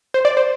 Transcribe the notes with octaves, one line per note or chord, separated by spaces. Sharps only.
C5
D5
C5